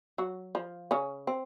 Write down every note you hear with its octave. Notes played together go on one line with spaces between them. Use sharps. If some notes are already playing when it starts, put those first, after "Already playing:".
F#3 F#4
F3 F4
C#3 C#4
C4